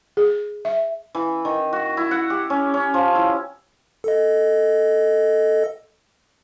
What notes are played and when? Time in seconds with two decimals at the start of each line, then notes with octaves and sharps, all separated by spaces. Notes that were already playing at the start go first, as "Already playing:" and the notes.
0.17 G#4
0.65 E5
1.15 E3
1.45 D#3
1.73 F#4
1.97 E4
2.11 F#5
2.30 G4
2.50 C#4
2.74 C#4
2.94 F3
3.15 E4
4.04 A4 D#5